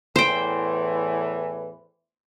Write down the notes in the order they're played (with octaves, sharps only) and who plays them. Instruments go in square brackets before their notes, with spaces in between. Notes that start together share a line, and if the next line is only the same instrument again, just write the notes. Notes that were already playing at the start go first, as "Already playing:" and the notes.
[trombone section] E2 A2 E3 [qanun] C5 G5